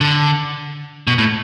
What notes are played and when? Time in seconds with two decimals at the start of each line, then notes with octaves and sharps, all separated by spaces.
0.01 D3
1.07 B2
1.18 A2